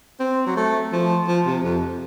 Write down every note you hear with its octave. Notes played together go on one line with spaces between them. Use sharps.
C4
F#3
A3
F3
F3
C3
F2